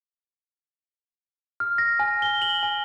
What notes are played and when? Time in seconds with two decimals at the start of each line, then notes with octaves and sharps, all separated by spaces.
1.60 F6
1.78 A#6
2.00 G#5
2.22 G7
2.42 F#7
2.63 G#5